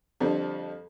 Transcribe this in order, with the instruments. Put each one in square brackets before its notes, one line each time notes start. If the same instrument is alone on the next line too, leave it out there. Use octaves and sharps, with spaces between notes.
[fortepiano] F2 D3 F3 G3